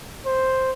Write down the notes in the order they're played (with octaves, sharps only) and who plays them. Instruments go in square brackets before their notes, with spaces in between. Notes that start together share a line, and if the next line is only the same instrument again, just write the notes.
[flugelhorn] C5